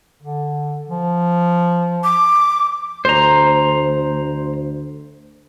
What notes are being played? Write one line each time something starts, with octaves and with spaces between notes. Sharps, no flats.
D3
F3
D6
D2 C5 A#5